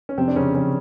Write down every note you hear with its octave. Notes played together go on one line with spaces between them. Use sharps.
C#4
F2 C3 C4
D4
F2 C#3 C#4
F2 C#3 C#4